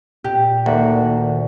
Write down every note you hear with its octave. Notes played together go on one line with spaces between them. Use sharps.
A#2 G4
D2 D#3 A#3 F#5